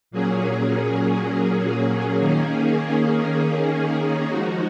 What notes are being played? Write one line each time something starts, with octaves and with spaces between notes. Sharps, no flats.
A#2 F#3 A#3 C#4 G#4
D#3 A#3 C#4 G#4
F3 G#3 D#4 F#4